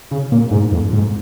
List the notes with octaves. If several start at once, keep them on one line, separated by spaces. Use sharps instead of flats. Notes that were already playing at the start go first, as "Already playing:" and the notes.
C#3
A#2
G#2
F2
G#2